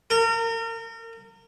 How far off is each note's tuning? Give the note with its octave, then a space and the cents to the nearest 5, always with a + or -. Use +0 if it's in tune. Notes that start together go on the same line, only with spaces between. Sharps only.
A#4 -35